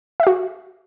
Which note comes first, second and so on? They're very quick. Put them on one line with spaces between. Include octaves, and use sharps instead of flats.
E5 F5 F#4